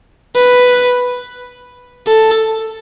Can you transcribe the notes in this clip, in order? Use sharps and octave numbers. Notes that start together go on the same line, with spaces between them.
B4
A4